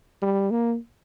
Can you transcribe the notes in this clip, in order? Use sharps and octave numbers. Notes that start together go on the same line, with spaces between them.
G3
A#3